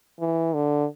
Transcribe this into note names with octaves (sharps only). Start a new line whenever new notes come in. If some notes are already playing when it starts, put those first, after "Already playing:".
E3
D3